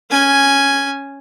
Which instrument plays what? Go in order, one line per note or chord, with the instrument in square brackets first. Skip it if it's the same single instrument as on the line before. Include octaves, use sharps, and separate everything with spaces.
[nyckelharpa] C#4 G#5